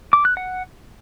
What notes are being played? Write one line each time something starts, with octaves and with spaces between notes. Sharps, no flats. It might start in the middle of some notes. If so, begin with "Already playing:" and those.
D6
F#6
F#5